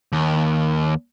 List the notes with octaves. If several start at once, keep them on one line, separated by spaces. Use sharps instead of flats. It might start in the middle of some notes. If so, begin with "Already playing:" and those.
D#2